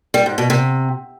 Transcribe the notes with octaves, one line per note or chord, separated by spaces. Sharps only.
G3
G#2
B2
C3